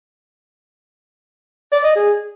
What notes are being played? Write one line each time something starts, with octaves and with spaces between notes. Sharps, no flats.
D5
D#5
G#4